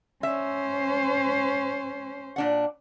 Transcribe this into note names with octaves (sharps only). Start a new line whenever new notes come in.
C#4 C5 E5
A#2 D4 F#5